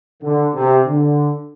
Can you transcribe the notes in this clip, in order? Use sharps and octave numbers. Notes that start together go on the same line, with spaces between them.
D3
C3
D3